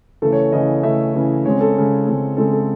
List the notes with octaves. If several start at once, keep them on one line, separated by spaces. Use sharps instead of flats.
C#3 E3 A3 A4
C#5
C#3 E3 A3 D#5
C#3 E3 A3 E5
C#3 E3 A3
C#3 G#3 C4 C#5
A4
C#3 G#3 C4
C#3 G#3 C4
C#3 G#3 C4 A4
A4